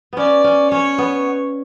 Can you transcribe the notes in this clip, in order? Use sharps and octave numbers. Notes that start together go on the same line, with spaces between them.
B3 C#4 D5
C#4
C#4 C#5
B3